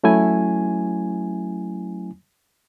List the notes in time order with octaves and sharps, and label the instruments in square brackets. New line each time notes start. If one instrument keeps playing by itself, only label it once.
[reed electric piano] F#3 A3 C#4 E4 G#5